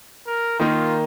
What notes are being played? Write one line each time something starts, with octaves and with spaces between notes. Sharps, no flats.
A#4
D#3 A#3 D#4 F4